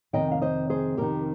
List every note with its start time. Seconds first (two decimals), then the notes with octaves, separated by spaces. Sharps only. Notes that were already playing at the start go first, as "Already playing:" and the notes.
0.13 F2 C3 D#3 D#5 G5
0.32 F5
0.42 C5 D#5
0.70 G#4 C5
0.97 F2 C3 D#3 G4 A#4